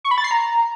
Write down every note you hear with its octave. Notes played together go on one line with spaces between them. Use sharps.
C#6
B5
A6
C7
A#5